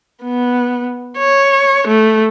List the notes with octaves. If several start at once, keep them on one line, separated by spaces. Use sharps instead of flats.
B3
C#5
A3